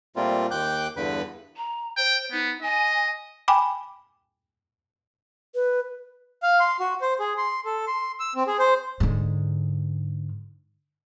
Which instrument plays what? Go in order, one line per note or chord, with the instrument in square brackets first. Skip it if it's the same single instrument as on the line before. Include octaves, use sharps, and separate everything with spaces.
[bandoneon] A#2 G3 A3 A#3 C4 F4
D#2 G5 D6 F#6 G6
E2 G2 D3 B4 B5
[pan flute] A#5
[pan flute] C5 [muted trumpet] G5
[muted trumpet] B3 [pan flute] D#4
[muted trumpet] D#5 [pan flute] G#5
[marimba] G5 G#5 B5 D6
[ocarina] B4
[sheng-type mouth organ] F5
C6
F#4
C5
G#4
C6
A4
C6
E6
C4
G#4
C5
[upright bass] G#2 D3